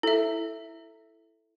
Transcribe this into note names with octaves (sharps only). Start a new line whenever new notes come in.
E4 A4 E5